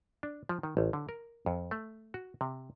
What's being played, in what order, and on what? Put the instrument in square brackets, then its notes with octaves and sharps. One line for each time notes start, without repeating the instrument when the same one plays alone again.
[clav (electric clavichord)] D4
F3
D#3
A1
D3
A#4
F2
A3
F#4
C3